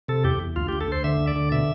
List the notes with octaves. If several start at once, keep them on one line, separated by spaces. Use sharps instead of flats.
C3 A4
E2 G4
E2
D2 F4
D2 G4
A4
D2 C5
D3 E5
D2
D5
D3
B2 E5